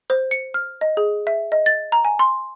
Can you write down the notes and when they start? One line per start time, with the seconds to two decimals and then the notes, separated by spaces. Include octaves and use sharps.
0.10 C5
0.31 C#7
0.54 F6
0.81 D#5
0.97 G#4
1.27 E5
1.52 D#5
1.66 A6
1.92 A#5
2.05 G#5
2.19 C6